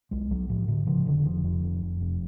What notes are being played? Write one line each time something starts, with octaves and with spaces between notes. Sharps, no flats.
B1 G#3
B1 F#3
A2 F3
A2 D3
C#3 F3
F1 D3
F1 F3
F2 F3
F1
F2
F1